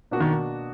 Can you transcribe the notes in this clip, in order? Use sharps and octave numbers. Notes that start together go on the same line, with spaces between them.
B2 A#3 D4 F#4
D#3